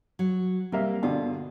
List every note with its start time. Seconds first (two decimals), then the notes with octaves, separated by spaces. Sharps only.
0.19 F#3
0.72 C3 G3 A#3 E5
1.03 G2 B2 D3 F4